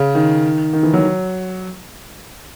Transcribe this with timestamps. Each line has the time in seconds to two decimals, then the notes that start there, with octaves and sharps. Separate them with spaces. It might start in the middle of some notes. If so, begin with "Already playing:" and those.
Already playing: C#3
0.15 D#3
0.73 D#3
0.83 E3
0.93 F#3